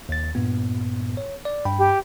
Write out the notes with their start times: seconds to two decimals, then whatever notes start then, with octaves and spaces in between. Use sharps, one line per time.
0.09 D#2 A6
0.35 G2 A#2 B3
1.17 C#5
1.45 D5
1.65 G2 G5 B5
1.79 G4